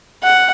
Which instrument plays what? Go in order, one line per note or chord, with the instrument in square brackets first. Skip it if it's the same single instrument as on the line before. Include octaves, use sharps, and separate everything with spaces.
[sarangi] F#5